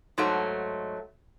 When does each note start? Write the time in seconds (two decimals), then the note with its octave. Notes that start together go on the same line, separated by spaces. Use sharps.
0.18 G#2 F#3 A3